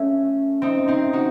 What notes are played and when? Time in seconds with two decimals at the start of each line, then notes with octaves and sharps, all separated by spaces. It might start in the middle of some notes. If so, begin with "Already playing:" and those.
Already playing: A3 C#4
0.62 C4 D#4
0.88 C4 D#4
1.13 D#4 F#4